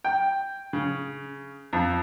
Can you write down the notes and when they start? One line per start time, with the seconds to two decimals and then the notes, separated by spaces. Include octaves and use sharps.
0.04 G5
0.73 C#3
1.73 F2